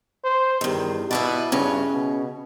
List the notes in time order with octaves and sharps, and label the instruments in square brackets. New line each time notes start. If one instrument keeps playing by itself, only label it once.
[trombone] C5
[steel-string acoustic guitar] E2 G2 [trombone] D#3
[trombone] B2 [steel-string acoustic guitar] E4 B4 D5
[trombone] G2 [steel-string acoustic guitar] C#3 C#4
[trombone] B2